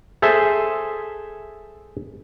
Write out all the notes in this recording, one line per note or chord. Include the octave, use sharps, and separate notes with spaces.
G#4 A4 C5 E5